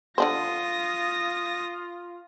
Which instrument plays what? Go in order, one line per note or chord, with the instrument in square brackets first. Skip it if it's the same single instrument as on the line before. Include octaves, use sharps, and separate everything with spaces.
[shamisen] D3 D4 C5 [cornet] F4 [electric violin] D#6 A#6